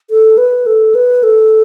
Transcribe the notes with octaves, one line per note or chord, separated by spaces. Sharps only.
A4
B4
A4
B4
A4